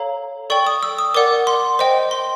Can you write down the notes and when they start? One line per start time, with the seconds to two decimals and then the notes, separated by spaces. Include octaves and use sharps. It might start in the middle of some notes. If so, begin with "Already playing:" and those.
Already playing: A4 C#5 F5 A#5
0.50 A4 D5 G5 C#6
0.67 D#6
0.83 E6
0.99 D#6
1.14 A#4 D5 F#5 D6
1.47 C6
1.79 C5 D#5 G5
2.11 C6